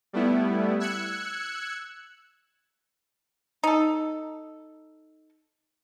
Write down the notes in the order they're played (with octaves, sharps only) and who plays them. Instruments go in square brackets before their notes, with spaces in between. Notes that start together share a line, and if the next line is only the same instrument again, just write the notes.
[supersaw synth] G3 A3 B3 E4
E6 F#6 G#6 C#7
[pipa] D#4 A4